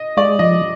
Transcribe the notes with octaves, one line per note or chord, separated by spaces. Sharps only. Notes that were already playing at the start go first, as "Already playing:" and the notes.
Already playing: D#5
G#3 D5
F3 D#5